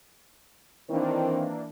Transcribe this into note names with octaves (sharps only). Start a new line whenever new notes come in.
D#3 E3 A#3 C4 D4